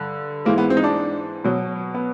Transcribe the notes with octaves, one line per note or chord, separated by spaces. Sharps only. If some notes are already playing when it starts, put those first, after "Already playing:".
Already playing: G2 D3
G#2 E3 G#3 A#3
B3
C4
D#4
D4
B2 F#3
B3